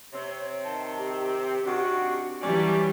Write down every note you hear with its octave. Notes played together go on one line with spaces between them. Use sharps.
C3 C4 C#5
D#3 A5
G4
C3 D#3 D4 F#4
E3 F#3 G3 C#4 D4 D5 G#5